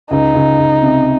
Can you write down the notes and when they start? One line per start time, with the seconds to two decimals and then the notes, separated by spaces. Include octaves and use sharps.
0.11 C#2 D#4
0.35 C#2
0.59 C#2
0.83 C3